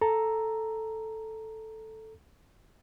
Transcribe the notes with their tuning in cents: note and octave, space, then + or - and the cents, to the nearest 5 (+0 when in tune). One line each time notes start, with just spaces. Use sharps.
A4 +0 A#5 +0